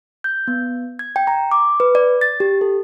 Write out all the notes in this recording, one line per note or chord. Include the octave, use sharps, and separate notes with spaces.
G6
B3
G#6
G5
A#5
D6
B4
D5
A6
G4
A4